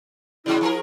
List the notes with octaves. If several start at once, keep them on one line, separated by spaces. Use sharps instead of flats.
C3 F#3 G#3 E4
F3 G#4 A#4